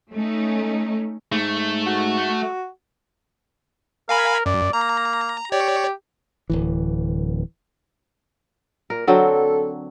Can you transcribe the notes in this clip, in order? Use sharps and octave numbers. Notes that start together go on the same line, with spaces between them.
A3 C#4 D#4
G#2 A3
F#4
A#4 F5 G#5 B5
F#2 D5
A#3 A#5
G4 C#5 D5
D1 G1 E3
A#2 A#4
D3 F#3 C4 A4